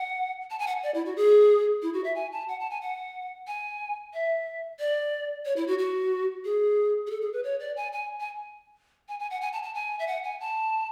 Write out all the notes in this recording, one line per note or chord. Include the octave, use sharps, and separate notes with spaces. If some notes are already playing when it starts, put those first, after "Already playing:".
Already playing: F#5
A5
G#5
F#5
D5
E4
F#4
G#4
E4
F#4
E5
G#5
A5
F#5
A5
G#5
F#5
G#5
E5
D5
C#5
E4
F#4
F#4
G#4
G#4
A4
G#4
B4
C#5
D5
G#5
G#5
G#5
G#5
G#5
F#5
G#5
A5
A5
G#5
E5
F#5
G#5
A5